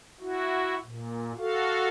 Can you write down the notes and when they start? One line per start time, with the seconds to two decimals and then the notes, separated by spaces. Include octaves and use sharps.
0.20 E4 F#4
0.84 A#2
1.38 F#4 A4 F5